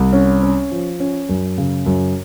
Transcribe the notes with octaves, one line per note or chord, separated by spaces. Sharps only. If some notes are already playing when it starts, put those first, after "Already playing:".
Already playing: C2
C#4
C#4
F3
C#4
F#2
C#3
F#2